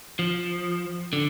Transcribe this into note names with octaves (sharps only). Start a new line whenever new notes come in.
F3
D3